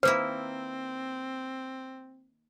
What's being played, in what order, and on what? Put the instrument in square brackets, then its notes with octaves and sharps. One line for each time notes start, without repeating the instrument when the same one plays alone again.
[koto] D#3 A#3 E4 [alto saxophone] C4 [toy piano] B4 [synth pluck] C5